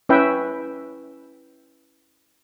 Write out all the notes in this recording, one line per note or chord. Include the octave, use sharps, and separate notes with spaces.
C#4 E4 B4 E5 G5